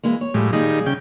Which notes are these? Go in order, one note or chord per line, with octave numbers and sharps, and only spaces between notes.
E3 G#3 A#3
C#5
A2 F3 G3 G#3
A#2 D#3 G3 D#4 G#4
C#3 G5